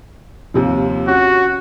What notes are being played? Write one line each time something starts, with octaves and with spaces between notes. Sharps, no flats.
D#2 C3 F3
C#4 F#4